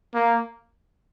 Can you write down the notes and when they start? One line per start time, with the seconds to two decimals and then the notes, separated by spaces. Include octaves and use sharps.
0.14 A#3